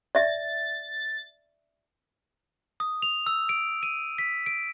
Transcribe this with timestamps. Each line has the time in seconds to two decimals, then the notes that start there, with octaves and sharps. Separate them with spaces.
0.15 D5 E5 A6
2.80 D#6
3.02 F7
3.27 E6
3.49 D7
3.83 D#7
4.18 B6
4.46 D7